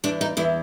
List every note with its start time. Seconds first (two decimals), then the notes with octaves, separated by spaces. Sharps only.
0.04 E2 D4
0.21 D#4
0.37 E2 E4